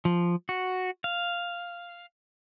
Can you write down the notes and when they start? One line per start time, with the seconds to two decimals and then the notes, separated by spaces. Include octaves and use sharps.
0.05 F3
0.49 F#4
1.04 F5